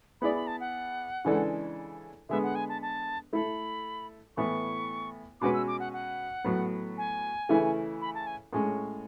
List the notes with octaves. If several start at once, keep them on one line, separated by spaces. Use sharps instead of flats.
B3 E4 G#4 D5 B5
B5
A5
F#5
C#3 E3 G#3 D4 A4
D3 G#3 B3 E5
F#5
G#5
A5
A5
A3 E4 A4 B5
A2 E3 B3 E4 C#6
B2 G#3 C#4 F#4 B4 D6
E6
D6
F#5
F#5
A2 F#3 B3
G#5
C#3 E3 A3 C#4 E4
B5
A5
G#5
A2 G#3 C#4